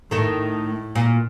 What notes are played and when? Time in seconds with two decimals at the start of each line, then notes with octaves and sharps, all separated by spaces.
0.11 A2 D#3 A3
0.95 A#2